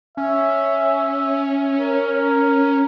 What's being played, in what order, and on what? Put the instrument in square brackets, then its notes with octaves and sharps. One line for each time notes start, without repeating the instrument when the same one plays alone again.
[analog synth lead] C#4 [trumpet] E5
[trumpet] A#4